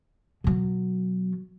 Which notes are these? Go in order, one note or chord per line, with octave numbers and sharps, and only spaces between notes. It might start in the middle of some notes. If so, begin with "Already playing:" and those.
B2 F#3